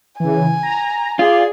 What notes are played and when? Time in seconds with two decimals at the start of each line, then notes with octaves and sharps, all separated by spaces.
0.20 C#3 E3 G#5
0.63 A#5
1.19 F4 G#4 D5